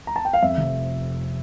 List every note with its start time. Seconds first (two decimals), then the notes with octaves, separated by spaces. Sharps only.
0.07 A#5
0.16 A5
0.25 G5
0.33 F5
0.42 F2 E5
0.57 F1